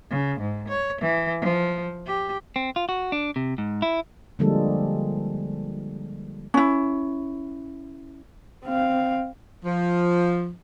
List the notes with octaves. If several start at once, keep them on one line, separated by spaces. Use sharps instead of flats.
C#3
G#2
C#5
E3
F3
G4
C4
F4
F#4
D4
C3
G#2
E4
D3 F3 G3 G#3 A#3 A4
C#4 E4
C4 F5
F3